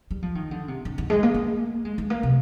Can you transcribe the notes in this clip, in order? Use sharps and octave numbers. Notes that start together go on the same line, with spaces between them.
G3
F3
D#3
D3
C3
D3
D#3
G#3
A#3
A#3
G#3
G#3
A#3
C3